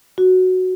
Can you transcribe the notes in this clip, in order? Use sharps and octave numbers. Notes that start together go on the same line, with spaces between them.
F#4